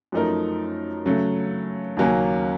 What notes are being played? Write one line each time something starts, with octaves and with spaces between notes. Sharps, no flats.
F#2 F3 A3 D#4 A#4
C#3 F#3 A3
D#2 C#3 F#3 A#3 C#4